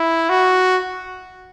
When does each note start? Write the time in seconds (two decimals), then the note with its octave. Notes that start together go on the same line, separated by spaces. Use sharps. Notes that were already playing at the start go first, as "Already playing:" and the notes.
Already playing: E4
0.29 F#4